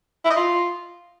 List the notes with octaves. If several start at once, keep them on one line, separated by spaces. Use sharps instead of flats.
E4
D#5
F4